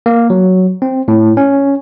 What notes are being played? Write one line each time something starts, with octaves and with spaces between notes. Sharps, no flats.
A#3
F#3
C4
A2
C#4